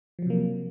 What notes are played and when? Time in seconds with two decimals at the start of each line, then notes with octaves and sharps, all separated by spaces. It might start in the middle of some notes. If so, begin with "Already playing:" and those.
0.19 F3
0.22 F#3
0.26 C3
0.30 A#3